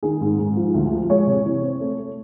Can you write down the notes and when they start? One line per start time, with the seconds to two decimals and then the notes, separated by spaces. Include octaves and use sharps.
0.03 D#3 G#4
0.21 G#2
0.38 G#2
0.56 F3
0.74 D2
0.92 F3
1.10 G#3 C#5
1.27 C3
1.45 E3
1.62 C4
1.80 A3
1.98 A3